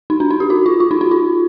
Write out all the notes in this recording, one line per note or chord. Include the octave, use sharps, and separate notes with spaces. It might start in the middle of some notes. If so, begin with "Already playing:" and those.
D#4
D4
D#4
G4
F#4
F4
F4
D#4
D#4
F4